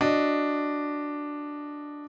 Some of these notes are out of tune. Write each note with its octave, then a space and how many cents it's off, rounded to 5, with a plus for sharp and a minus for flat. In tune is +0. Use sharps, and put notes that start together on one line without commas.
D4 +0 F#4 +0 D#5 +0